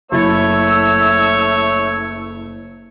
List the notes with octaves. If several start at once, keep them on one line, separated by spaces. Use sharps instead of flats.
F#1 A3 E4 C#5 E6 A6